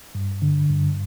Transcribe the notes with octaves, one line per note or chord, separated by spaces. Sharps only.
G2
D3
G2